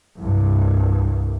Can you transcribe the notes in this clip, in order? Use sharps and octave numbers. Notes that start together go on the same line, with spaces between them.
C2 G2